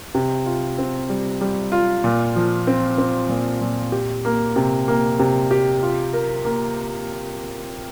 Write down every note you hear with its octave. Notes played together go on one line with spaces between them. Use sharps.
C3
F4
C4
G3
G3
F4
A#2
F3
C4
C4
A#2
A#2
G4
A#3
C3
A#3
C3
G4
F4
A#4
A#3